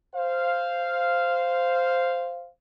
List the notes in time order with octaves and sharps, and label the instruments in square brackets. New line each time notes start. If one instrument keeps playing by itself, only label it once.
[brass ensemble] C5 F5